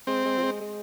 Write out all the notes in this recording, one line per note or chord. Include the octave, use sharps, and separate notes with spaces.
G#3 C4
G#3
F3
G#3
G#3